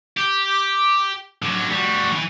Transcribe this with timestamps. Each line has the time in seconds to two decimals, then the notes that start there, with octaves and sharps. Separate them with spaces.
0.17 G4
1.42 D3 F#3
1.71 G3 F#4
2.12 D#3 E3